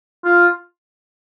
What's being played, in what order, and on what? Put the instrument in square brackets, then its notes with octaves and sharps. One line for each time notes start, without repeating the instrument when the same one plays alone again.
[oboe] F4